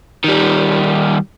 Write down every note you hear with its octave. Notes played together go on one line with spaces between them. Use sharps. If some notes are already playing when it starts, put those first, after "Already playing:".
D#3 G3